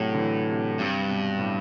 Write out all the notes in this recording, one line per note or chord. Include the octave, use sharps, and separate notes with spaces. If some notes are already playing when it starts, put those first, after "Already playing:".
Already playing: A2 C3 F#3
D3
E3
C3
G2 C3
B2
A2